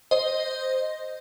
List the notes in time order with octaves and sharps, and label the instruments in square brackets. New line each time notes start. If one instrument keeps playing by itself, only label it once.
[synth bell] C5 D#5